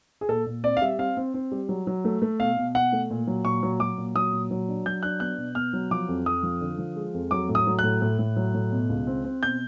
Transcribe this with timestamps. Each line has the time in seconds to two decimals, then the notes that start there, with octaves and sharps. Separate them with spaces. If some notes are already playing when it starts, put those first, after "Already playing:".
0.21 G#4
0.29 A#2 A4
0.46 A#2
0.64 C4 D5
0.77 F5
0.82 G3 E5
0.99 C4 F5
1.17 C4
1.34 C4
1.52 G3
1.69 F#3
1.87 F#3
2.05 A3
2.22 A3
2.40 B2 F5
2.57 B2
2.74 B2 F#5
2.92 A3
3.11 A#2
3.27 F#3
3.45 A#2 C#6
3.63 F#3
3.80 F#3 D6
3.98 A#2
4.15 F#3 D#6
4.33 A#2
4.51 F#3
4.68 D4
4.86 F#3 G6
5.03 D4 F#6
5.20 B3 F#6
5.38 B2
5.55 B3 F6
5.73 F#3
5.91 F3 D6
6.08 F2
6.26 F2 D#6
6.43 F3
6.61 D3
6.78 F3
6.96 G#3
7.14 F2
7.31 F#3 D6
7.49 A2
7.55 D#6
7.67 F#3
7.79 A2 F#6
8.02 A2
8.19 A2
8.36 F#3
8.54 A2
8.72 B2
8.89 C#2
9.07 C4
9.25 C4
9.42 B2 G6